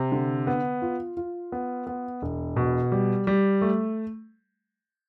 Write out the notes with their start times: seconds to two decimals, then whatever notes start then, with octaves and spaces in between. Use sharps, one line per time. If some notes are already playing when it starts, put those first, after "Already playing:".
Already playing: C3
0.12 D3
0.47 B3
0.82 F4
1.17 F4
1.52 B3
1.87 B3
2.22 E1
2.56 B2
2.92 G3
3.27 G3
3.62 A3